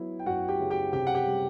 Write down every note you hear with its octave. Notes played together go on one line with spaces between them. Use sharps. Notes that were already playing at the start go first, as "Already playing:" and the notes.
Already playing: F#3 B3 E4
G5
F#2 F#4 F#5
G4 G5
C#3
G4 G5
C3 G4 G5
F#5
G4 G5
G3